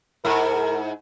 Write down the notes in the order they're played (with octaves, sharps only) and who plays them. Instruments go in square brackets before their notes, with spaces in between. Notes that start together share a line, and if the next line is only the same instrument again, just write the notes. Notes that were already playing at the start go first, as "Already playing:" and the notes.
[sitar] G#2 E4 [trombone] A#4